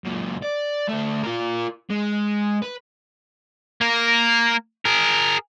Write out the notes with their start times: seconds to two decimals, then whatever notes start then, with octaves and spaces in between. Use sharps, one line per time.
0.05 F#2 A#2
0.43 D5
0.89 D2 A3
1.23 F4 A#4
1.90 G#3
2.62 B4
3.81 A#3 A#4
4.85 G#4 A#4